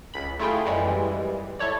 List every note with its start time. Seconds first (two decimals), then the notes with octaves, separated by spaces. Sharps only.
0.14 C#2 B5
0.40 A3 E4 F4 G#4 G5
0.65 F#2 E3 G3 G#3
1.59 E4 A4 C#5 D5